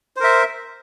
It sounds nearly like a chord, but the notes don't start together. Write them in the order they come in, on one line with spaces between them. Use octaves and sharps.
C5 A#4 E5